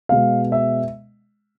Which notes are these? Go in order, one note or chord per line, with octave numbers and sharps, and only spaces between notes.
B2 G#3 F5
E5